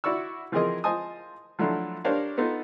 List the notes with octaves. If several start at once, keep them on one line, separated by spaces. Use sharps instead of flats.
E4 F#4 D5 C#6 E6
E3 F3 C4 G#4 A#4 D#5
F4 C5 D#5 G#5 A5 D#6
F3 F#3 A3 D4 E4 F4
D4 G4 A#4 C5 C#5 F5
B3 D#4 F4 A4